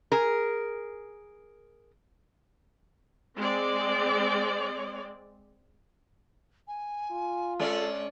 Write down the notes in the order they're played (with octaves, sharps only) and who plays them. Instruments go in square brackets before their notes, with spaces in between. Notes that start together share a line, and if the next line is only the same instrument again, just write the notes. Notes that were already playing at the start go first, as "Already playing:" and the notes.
[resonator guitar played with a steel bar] G#4 A#4
[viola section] G#3 C4 D5
[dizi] G#5
[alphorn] F4
[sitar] G#3 C#4 D5 [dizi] A4